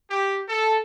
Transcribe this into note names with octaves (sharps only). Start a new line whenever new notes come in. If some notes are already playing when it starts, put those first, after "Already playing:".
G4
A4